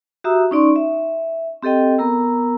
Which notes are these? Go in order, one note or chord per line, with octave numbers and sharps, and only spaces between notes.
F#4 G4 E5 A#5 D#6 E6
C#4 D#4 D5 C6 C#6
E5
C4 G4 A4 D#5 G5
B3 A#4 A#5 E6